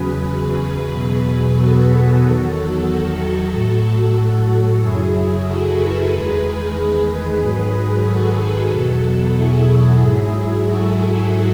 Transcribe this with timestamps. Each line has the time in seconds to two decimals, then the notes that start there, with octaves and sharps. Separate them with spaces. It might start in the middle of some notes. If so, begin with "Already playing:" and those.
Already playing: E2 C#3 F#3 G#4 B4
0.90 E2 B2 F#3
1.55 F#4 A4
2.20 E2 D#3 F#3
2.85 F#4 A4
3.50 A2 F#3
4.15 F#4 A4
4.80 F#2 C#3 F#3 E4 G#4
5.45 F#4 A4
5.77 G#4 B4
6.10 E2 D#3 G#3 G#4 B4
7.40 G#2 D#3 F#3
8.05 F#4 A4
8.70 E2 B2 F#3
9.35 E4 G#4
10.00 G#2 F#3
10.65 F#4 A4